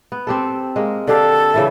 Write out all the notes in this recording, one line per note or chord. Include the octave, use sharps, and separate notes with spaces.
B3
C4 G4 A4
G#3 A#3
D3 G4 A4 F5
C#3 E3 E5